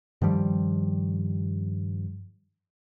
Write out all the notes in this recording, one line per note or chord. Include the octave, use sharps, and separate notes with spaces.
G2 D#3 F3 G3